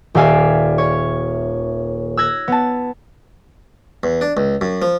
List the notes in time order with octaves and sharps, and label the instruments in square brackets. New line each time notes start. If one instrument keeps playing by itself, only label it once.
[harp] D#1 G4 D5 E5 F5 G#5
C#5
E6 F#6 G#6 A#6
B3 A5
[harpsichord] E2
D4
C#2
F#2
F3